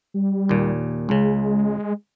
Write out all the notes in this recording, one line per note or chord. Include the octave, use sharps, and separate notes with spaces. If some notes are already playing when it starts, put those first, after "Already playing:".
G3
D#2 A#2
C#2 C#3 G#3